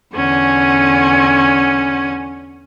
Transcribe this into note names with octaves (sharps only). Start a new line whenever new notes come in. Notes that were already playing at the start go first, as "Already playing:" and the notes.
E2 D3 C#4 F#5 G#5